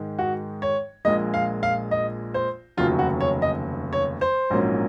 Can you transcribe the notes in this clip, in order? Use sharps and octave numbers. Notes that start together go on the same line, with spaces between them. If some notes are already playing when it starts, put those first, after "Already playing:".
Already playing: G#2 D#3 G#3
F#4
C#5
A#1 A#2 G#3 D#5
F5
F5
D#5
C5
F1 D#2 C#3 F#3 F4
F#4
C#5
D#5
C#5
C5
A#1 G#2 F#3 A#3 C#4